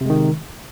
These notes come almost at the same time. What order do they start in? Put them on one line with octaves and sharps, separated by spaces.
C3 G#3 D#3